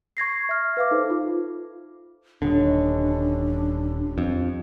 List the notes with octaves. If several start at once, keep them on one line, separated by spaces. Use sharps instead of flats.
C#6 G#6 A#6 C7
E5 F6
B4 F5 D6
D#4 A4 C5
F4
D#1 D3 G3 C#4 D4 D#5
F2